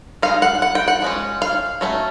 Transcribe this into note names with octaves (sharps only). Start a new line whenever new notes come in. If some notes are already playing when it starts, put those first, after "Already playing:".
G#3 C4 D#4 F5
F#5
F#5
G5
F#5
F3 G#3 C#4
F5
F#3 A3 C#4